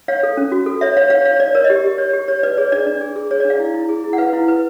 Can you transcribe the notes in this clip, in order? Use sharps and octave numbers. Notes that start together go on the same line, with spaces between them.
C#5 F5
A4
C#4
F#4
A4
C#5 E5
C#5 F5
C#5 F5
C#5 F5
C#5 D5
A#4 C#5
D#5
G4
G4
C#5
G4
C#5
B4 D5
G#4 C#5
D4 D5
D4
G#4
G#4
G#4 C#5
D5
D4
F5
E4
E4
G#4
E4
F#5
B4 F5
E4
B4